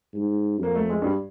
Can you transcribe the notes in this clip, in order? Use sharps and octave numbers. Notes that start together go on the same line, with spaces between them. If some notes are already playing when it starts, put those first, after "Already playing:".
G#2
F2 A#3
A3
G#3
G2 G3